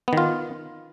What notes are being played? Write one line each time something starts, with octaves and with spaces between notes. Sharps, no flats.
D#3 B3 F4